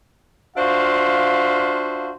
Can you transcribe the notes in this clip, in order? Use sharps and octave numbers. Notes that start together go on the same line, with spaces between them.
D4 F4 F#4 C5 E5 F5